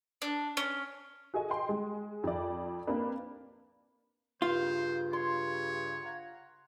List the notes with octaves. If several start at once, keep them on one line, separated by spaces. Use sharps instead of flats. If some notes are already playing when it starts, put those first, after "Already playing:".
D4
C#4
F#4 G#4 A4 D#5 G#5
D#5 G5 C6
G#3
F2 D5
A#3 C4 D4 B4
G2 C#3 F4 C5
C#5 C6
F5 F#5 A#5